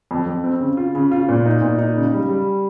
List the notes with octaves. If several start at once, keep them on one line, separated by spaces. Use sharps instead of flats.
F2
F2
C4
C#3
F4
C#3
F4
A#2
D#4
A#2
D#4
C#3
G3
G3